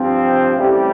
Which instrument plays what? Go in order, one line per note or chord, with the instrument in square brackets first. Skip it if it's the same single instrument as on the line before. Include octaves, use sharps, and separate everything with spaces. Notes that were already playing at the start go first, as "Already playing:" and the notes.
Already playing: [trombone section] G2 F3 C4
A1 A2 G3 C4 G4